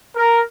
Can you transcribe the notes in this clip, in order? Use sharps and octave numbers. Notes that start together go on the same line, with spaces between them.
A#4